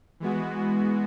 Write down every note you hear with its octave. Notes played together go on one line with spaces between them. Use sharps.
E3 G#3 B3 F#4